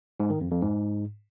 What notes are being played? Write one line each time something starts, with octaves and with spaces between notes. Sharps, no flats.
G#2
D#3
F2
F2
G#2